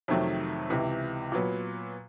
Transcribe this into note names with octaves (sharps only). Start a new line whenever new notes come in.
F2 C3 D#3 F#3 A3
C#2 C3 E3
A#2 F#3 B3